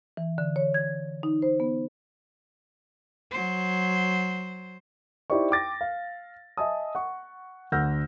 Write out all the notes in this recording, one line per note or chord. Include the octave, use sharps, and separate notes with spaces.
E3
D3
C#5
G#6
D#4
C5
B3
F#3 C5
D#4 E4 G4 C5 D5 C#6
G5 D6 A6 A#6
F5
D#5 E5 G#5 A5 D#6
F#5 C#6
D2 F#5 E6 F6 G6 A#6